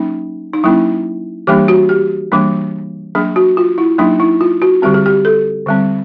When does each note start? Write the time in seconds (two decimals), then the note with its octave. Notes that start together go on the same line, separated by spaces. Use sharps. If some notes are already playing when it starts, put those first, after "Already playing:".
Already playing: F#3 A#3 C#4 D#4
0.53 D#4
0.64 F#3 A#3 C#4 E4
1.47 E3 G3 A#3 D4 G4
1.68 F#4
1.89 G4
2.32 E3 G3 A#3 D4
3.15 F#3 A#3 D4 G#4
3.36 F#4
3.57 F4
3.78 E4
3.98 F#3 A#3 D4 D#4
4.20 E4
4.41 F4
4.62 F#4
4.82 D3 G3 C4 G4
4.94 G#4
5.06 G4
5.25 A4
5.66 D3 G3 C4